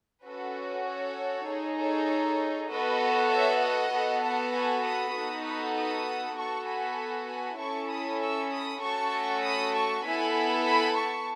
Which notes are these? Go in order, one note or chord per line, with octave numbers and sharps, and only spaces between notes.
C#4 F#4 A4 B4
A4 C#5
D#4 G#4
A4 C#5
B3 F#4 A4 B4 D#5
C#5 E5
D#5 F#5
B3 F#4 A4
F#5 A5
G#5 B5
B5 D#6
B3 D#4 F#4 A4
B5 D#6
B5 D#6
B3 F#4 A4 A5 C#6
G#5 B5
G#5 B5
C#4 E4 A4 A5 C#6
B5 D#6
C#6 E6
B5 D#6
A3 C#4 F#4 A4 A5 C#6
B5 D#6
A5 C#6
B3 E4 A4 G#5 B5
G#5 B5
A5 C#6